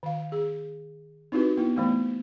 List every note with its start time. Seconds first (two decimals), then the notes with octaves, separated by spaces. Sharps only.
0.03 D#3 F5
0.32 G#4
1.32 C4 D#4 E4 F#4 G4 B4
1.57 B3 E4
1.77 E3 A3 B3